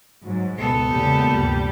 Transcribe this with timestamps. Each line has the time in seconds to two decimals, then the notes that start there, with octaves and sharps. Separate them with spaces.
0.24 G#2 F#3
0.57 C#2 B2 B3 A4
0.91 E2 A#2 C#3 G#3 G4
1.30 D2 G2 C3 G3 G4